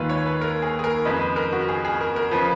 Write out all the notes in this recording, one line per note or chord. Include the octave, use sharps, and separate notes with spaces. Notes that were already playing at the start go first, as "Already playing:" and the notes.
Already playing: D#2 D#3 G#3 F4 B4
C#5
B4
A#4
G#4
G#4
A#4
F2 C#3 G#3 B4
B4
A#4
F#4
G#4
G#4
A#4
A#4
C#3 F3 B4